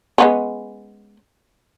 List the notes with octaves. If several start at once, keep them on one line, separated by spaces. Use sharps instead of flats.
G#3 B3 C#4